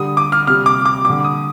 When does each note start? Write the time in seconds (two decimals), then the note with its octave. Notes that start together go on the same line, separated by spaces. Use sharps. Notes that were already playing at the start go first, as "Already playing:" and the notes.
Already playing: D3 G3 D#6
0.17 D6
0.32 F6
0.47 C3 G3 F6
0.66 D6
0.85 D6
1.05 D3 G3 D6
1.24 D#6